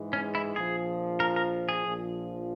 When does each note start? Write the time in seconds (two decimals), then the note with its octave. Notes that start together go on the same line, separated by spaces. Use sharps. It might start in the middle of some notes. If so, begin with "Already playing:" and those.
Already playing: G#2 E3 G#3
0.13 C#4
0.35 E4
0.56 A#1 A#2 F3 G#4
1.20 A#4
1.36 A#4
1.69 G#4
1.84 A#1 A#2 F3